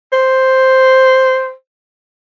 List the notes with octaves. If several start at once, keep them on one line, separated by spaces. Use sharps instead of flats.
C5